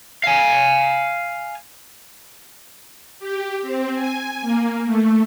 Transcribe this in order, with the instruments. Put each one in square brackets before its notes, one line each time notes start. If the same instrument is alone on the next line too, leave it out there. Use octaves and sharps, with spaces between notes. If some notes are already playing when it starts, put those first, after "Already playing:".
[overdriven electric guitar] F5 G#5
[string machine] G4
C4
G#5
A#3
A3